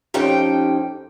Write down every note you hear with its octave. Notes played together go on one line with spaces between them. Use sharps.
F2 C#4 D#4 G4 G5